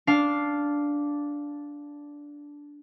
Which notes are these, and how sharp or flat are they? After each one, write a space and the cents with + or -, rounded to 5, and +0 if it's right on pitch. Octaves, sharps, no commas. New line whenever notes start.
D4 -10 F5 +0